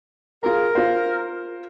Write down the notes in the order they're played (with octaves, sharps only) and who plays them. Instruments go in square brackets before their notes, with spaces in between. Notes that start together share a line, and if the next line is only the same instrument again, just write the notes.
[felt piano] F4 G#4 A#5 [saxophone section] A#4
[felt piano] F4 C5